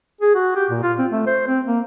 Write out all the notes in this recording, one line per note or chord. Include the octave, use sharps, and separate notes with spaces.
G#4
F#4
G4
A#2
F4
C4
A3
C5
C4
A#3